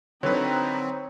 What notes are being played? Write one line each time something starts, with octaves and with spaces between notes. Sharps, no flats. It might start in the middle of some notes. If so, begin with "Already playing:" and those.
D3 F#3 C4 D#4 B4 C#5